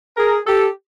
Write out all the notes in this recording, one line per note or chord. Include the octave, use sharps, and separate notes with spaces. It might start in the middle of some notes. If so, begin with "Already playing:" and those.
G#4 A#4
G4 A4